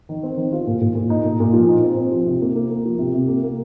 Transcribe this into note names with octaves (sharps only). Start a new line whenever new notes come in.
D#3
C4
D#3
F4
A#2
A#2
A#2
D#4
A#2
A#2
F3
D#4
C4
C4
F3
C3
A#3
A#3
A#3
F3
C3
C3
A#3
A#3